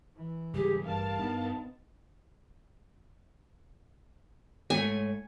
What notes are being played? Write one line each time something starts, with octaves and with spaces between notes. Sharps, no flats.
E3
G#2 C#3 G3 G4 G#4
A1 G2 A#4 F5 A5
G2 B3 D4 D#4
G#2 A3 C#4 D#4 C#5 G#5